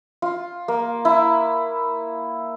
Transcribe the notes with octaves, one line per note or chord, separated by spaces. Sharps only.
F4
A#3
E4